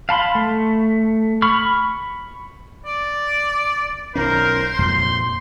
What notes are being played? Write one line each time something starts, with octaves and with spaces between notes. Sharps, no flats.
F5 A5 B5 C6
A3
B5 C#6 F6
D5
B1 D#3 C#4 A#4 C5
F2 A#2 C6